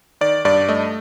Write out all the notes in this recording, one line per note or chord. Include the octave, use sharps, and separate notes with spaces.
D#3 D5
G2 D5
A3 D#5